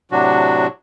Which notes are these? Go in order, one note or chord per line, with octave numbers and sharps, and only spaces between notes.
A2 C3 F#3 D4 F#4